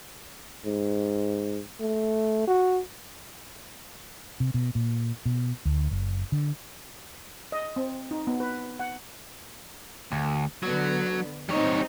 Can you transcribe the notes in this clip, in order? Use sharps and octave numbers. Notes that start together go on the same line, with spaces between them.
G#2
A3
F#4
C3
B2
A#2
B2
D2
F#1
D3
D#5
C4
D#4
B3
B4
F#5
D2
D3 F#3 B3
G3 C4 D#4 C#5